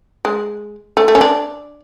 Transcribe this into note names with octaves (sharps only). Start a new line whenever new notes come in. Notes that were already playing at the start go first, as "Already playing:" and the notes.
G#3
A3
A3
C#4
D4